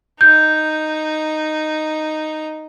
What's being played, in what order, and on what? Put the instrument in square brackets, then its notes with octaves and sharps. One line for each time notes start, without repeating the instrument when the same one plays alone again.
[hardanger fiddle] D#4 [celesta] G6